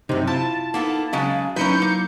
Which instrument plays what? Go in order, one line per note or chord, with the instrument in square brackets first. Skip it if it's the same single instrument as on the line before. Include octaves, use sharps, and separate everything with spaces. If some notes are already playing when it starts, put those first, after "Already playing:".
[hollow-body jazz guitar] F#2 D#4 [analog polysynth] C3
[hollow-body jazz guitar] E4 F4 [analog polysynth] A5
[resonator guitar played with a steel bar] A#3 B3 A4 [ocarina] D#4
[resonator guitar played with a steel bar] C#3 F#3 G#3 [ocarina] F5
[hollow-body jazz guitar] F#3 E4 [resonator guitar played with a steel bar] C#4 A#4 B4 [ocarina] D#4 [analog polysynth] G6 C#7
[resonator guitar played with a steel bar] A#3